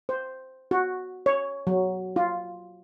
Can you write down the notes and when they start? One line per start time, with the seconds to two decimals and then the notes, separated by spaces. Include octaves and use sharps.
0.09 C5
0.71 F#4
1.26 C#5
1.67 F#3
2.16 F4